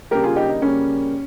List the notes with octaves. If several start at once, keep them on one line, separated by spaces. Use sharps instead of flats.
C#3 G3 A#3 G4 A#4
F4 G#4
D#4 G4
D#4
C#3 G3 A#3 C#4